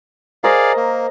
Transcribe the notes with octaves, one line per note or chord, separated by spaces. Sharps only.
G#4 A#4 C5 D5 D#5 F5
A#3